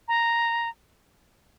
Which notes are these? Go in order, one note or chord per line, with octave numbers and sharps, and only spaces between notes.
A#5